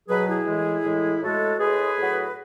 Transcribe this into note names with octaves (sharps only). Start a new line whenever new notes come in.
B2 F#3 G#4 B4
E4 G#4
A2 E3 G#3
A2 E3 G#3
A2 G#3 F#4 A4
A2 G#3 G#4 B4
A2 F#3